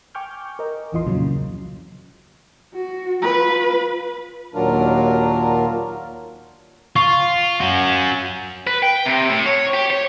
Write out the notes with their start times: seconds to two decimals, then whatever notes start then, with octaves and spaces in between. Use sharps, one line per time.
0.15 G5 G#5 C#6 D6 F6 G6
0.59 A#4 D#5
0.92 A1 E2 E3 F4 D#5 C6
1.05 C2 F2 A#2 C#3 F#3
2.74 F#4
3.22 F4 B4
4.54 D#2 A#2 F#3 D4 F4 A#4
6.96 F4 C#6
7.60 C#4 F#4
8.67 B4
8.82 G5
9.06 C3
9.29 A2
9.46 C#5
9.74 G4
9.91 C#5